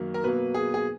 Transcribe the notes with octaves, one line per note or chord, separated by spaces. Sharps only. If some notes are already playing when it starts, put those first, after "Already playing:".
Already playing: F#2 D#3 F#3 A#3
A#4
B2 F#3 A#3 B4
G#4
G#4